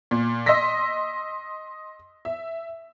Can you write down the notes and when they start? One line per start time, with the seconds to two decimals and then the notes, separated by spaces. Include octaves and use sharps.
0.11 A#2
0.46 D#5 C6 E6 A#6 B6
2.25 E5